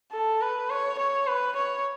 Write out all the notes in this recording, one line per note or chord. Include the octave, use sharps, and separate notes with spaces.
A4
B4
C#5
C#5
B4
C#5